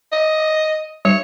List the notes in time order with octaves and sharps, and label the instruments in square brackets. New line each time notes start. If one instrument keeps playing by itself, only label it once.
[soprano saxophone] D#5
[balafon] G3 [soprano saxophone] C#5